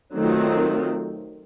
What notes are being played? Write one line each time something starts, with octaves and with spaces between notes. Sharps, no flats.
D#3 F#3 A3 C4 F4